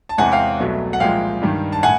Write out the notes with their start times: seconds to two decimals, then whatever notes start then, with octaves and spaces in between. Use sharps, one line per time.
0.09 A5
0.18 E2 C3 E3 G#3 F#5 G#5
0.32 F5 G5
0.60 C2 B2 F#3 A3
0.93 F#5
1.00 C2 A#2 F3 G#3 F5 G5
1.42 G2 D#3 G3
1.72 A5
1.83 A2 F#5 G#5